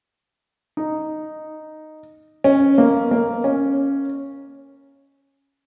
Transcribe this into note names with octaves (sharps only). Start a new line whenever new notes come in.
D#4
C#4
A#3
A#3
C#4